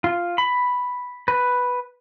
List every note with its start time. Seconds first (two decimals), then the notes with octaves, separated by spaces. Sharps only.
0.04 F4
0.38 B5
1.28 B4